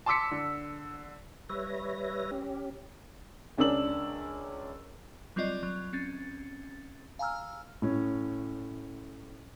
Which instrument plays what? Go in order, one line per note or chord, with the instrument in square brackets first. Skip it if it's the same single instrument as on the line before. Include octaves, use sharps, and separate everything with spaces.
[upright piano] A5 C6 D6 E6 B6 C#7
D3
[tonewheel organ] G3 B4 C#5 E5 A#6
C#4 G4
[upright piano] C#2 C#4 D4 A#4 E6 F#7
[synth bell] F#3 G3 C4 F4 D5 D#5
F#3
C4 C#4 A6
F5 G#5 A#5 E6 F6
[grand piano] A2 C#4